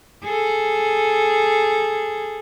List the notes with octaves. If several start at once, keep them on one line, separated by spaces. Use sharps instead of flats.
G#4 A4